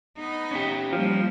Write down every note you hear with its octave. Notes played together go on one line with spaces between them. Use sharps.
B3 D#4
C#4 G4
F3 G3 A#3